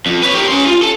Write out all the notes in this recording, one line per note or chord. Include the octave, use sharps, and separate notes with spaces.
F2
B4 C#5
G4 A#4
C#4 C6
F4
A4